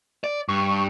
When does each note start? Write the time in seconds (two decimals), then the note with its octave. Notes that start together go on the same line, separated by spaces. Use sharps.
0.24 D5
0.48 G2 C#6